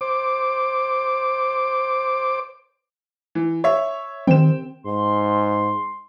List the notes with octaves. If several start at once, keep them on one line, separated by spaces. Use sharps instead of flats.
C5 D6
E3
C#5 E5
D#3 C4 G5 E7
G#2 C6